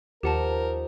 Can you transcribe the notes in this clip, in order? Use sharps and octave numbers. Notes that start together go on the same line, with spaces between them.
D#2 F3 D#4 G4 A#4 F#5 A5